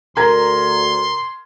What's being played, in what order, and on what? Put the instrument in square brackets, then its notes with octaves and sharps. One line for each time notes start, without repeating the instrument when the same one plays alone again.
[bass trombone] D2 [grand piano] A#4 [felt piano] A#5 G#6 [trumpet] C6